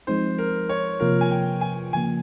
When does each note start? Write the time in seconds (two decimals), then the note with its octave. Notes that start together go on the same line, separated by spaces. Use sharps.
0.07 F3 G#3 C4 D#4 C5
0.38 A#4
0.69 C#5
1.00 C3 F3 A#3 F4 A#4
1.21 G#5
1.31 G5
1.61 G#5
1.93 C#3 F3 A#3 G#5